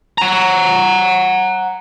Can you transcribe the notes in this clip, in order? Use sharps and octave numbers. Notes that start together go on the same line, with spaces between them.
F#5 A#5